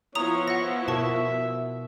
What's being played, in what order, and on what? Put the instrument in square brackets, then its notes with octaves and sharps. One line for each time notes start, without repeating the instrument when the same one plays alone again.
[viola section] F3 B3 E4 [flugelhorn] C#5 [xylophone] A#5 D#6 F7
[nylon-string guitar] E5 [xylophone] F#5 A#6
[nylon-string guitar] B2 F#4 A#4 [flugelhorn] E5 [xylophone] A5 C#6